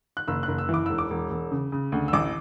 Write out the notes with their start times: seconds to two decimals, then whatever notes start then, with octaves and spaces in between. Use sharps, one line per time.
0.17 F#6
0.28 F#1 E6
0.43 F#6
0.48 F#1
0.58 E6
0.69 E3
0.74 D6
0.86 E1 E6
0.98 D6
1.10 E1
1.31 E1
1.51 C#3
1.72 C#3
1.92 D2
2.08 E6
2.13 A1 D6